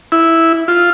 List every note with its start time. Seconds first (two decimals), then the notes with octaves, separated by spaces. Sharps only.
0.12 E4
0.68 F4